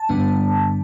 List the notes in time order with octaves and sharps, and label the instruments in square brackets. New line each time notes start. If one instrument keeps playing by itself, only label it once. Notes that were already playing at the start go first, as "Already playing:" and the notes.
Already playing: [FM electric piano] A5
G2 D3 G3 B3 D4